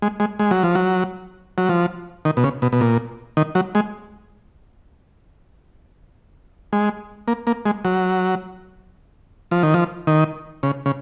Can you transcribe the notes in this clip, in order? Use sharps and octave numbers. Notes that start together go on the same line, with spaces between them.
G#3
G#3
G#3
F#3
F3
F#3
F#3
F3
D#3
B2
C#3
B2
B2
A#2
D#3
F#3
G#3
G#3
A#3
A#3
G#3
F#3
F3
D#3
F3
D#3
C#3
C#3